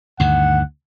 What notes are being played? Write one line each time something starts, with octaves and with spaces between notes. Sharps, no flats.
D2 G2 D#3 F#5